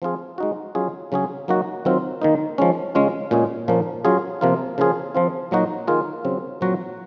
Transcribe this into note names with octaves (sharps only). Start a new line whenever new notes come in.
F3 C4 F4 G#4
G#3 D#4 F#4
F#3 C#4 F4 G#4
C#3 F#3 C#4 G#4
F#3 A#3 D#4 F#4
D#3 F#3 C4 F4
D#3 A#3 D#4
F3 G#3 C#4
C#3 G#3 C#4 F4
A#2 G#3 C#4 G#4
A#2 F3 A#3 C#4
F#3 C#4 F4 G#4
C3 F3 A#3 F4
C#3 F3 A#3 F4 G#4
F3 C4 F4
A#2 F#3 A#3 D#4 F#4
D#3 A#3 F4 G#4
C#3 F#3 C4
A#2 F#3 C4 F#4